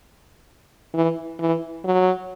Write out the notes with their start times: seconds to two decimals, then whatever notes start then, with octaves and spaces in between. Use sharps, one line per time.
0.94 E3
1.39 E3
1.84 F#3